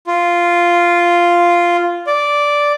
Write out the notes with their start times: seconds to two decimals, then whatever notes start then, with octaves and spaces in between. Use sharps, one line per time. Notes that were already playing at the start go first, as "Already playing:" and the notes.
0.07 F4
2.07 D5